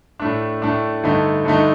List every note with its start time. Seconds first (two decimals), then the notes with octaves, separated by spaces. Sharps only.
0.20 A2 A3 D4
0.62 A2 A3 D4
1.03 G2 D3 A3 D#4
1.45 G2 D3 A3 D#4